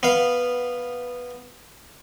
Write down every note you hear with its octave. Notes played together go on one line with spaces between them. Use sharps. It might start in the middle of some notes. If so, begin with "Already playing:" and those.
B3 F5